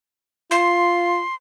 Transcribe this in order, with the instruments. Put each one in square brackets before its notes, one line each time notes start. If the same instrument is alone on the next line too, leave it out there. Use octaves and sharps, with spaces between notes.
[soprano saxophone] F4 [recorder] C6